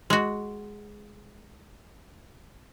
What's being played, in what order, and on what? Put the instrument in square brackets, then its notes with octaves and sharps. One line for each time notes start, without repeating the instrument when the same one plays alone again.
[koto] G#3 F#4